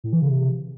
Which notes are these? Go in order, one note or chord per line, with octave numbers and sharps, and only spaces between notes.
A2
E3
C#3
C3